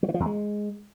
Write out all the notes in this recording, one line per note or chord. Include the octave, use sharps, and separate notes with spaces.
F#3
E3
F3
E2
G#3